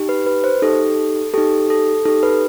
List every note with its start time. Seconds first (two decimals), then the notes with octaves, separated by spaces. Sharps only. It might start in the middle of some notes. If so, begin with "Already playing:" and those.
Already playing: D#4 G4
0.09 B4
0.27 B4
0.44 C5
0.62 D#4 G4 A4
1.34 D#4 G4 A4
1.70 A4
2.05 D#4 G4 A4
2.23 B4